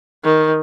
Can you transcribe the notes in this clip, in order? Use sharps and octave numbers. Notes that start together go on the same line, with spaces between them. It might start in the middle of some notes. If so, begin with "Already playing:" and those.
D#3